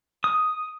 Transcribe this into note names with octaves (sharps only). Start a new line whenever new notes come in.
D#6